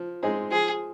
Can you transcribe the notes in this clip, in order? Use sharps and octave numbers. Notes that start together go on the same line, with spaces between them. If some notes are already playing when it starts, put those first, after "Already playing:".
Already playing: F3
G#3 C4 D#4 G#4
F3 G#4